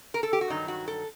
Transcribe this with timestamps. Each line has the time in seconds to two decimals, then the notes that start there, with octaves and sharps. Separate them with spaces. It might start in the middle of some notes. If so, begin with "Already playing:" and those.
0.14 A#4
0.23 A4
0.33 G4
0.41 F#4
0.50 G2 D#3 F#3 D#4
0.68 F#4
0.88 A4